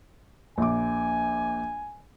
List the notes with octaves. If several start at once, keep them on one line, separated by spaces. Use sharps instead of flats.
A#1 G#5 D6